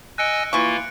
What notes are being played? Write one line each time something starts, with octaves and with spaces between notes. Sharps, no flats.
D#5 G#5 E6 F#6 C#7 D7
E3 A#3 F4 C#6